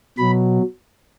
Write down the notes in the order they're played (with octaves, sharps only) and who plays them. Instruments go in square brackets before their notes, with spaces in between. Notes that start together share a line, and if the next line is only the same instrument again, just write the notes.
[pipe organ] B2 F#3 B5